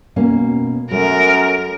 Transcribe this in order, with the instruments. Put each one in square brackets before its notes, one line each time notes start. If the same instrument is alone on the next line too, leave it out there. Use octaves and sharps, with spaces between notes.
[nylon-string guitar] B2 A#3 C#4
[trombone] F#2 [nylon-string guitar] A3 [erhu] A#4